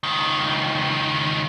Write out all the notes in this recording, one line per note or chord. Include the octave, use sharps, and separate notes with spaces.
C#2 D#3